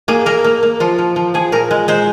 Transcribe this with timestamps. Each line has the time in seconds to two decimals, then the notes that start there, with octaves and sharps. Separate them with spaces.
0.08 A#3 G#4
0.26 A#3 A#4
0.44 A#3
0.63 A#3
0.80 F3 F4
0.98 F3
1.16 F3
1.34 F3 G#4
1.52 A#2 A#4
1.71 G#3
1.88 G#3 C5